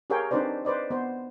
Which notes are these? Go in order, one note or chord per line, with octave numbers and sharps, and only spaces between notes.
G4 G#4 A#4 C#5 F5 G5
C4 D4 D#4 B4 C5 D5
B4 C5 D5 D#5
B3 C5